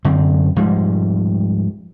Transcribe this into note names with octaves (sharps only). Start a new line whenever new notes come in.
F#2 D3 C4
G#2 F3 G3 G#3